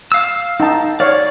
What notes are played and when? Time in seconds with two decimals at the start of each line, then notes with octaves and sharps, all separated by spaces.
0.12 F5 E6
0.60 D#4 A5
1.00 C#5 D5 F5